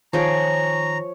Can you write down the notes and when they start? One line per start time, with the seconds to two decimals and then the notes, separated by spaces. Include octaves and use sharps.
0.13 D#3 F3 G#4 C#5 G5 A#5